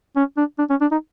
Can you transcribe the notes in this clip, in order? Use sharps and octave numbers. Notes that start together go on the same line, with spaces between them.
C#4
D4
D4
C#4
D4
D#4